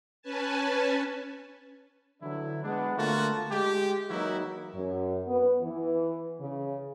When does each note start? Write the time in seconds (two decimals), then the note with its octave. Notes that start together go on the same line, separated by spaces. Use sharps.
0.22 C#4 B4 G#5 A5
2.22 D3 E3 F#3 D4 E4
2.64 G#3 B3 D4
2.97 D3 A3 A#3 F4 F#4 A5
3.51 G#3 G4
4.10 E3 F#3 A#3 D#4 E4 F#4
4.74 F#2
5.27 B3
5.61 E3
6.39 C#3